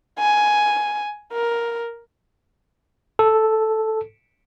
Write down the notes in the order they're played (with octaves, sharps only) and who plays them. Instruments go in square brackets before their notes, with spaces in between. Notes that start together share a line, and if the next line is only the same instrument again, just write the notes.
[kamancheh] G#5
A#4
[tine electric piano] A4